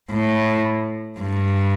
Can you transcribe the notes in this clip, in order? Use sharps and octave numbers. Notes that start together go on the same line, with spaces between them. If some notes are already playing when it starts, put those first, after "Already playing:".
A2
G2